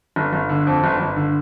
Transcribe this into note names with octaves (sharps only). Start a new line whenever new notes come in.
G1
G1
D3
F2
G1
G1
D3